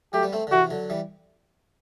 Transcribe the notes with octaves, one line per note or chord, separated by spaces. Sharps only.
F#3 A3 G4
G3 B3
A3 C4
D3
C3 E3 F#4
D3 F#3
E3 G3